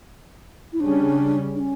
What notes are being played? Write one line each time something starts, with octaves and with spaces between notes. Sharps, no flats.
E4
C#3 G3 C#4 D4
D4
C#4